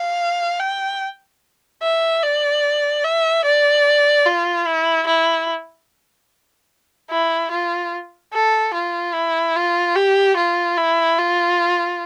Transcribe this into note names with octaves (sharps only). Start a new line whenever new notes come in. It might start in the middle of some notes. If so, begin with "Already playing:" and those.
Already playing: F5
G5
E5
D5
E5
D5
F4
E4
E4
E4
F4
A4
F4
E4
F4
G4
F4
E4
F4